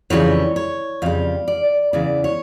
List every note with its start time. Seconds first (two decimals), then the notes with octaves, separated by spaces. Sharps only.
0.10 F2 C#3 E3 G3 C#5
0.56 C#5
1.02 F2 C#3 G3 F5
1.48 D5
1.93 E2 C#3 E3 D5
2.24 C#5